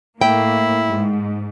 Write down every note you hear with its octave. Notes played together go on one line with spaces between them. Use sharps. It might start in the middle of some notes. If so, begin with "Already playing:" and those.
A2 A#3 E4 G5
G#2